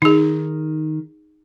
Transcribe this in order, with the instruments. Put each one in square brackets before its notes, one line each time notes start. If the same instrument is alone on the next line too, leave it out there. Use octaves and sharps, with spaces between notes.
[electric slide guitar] D#3 [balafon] D#4 G#4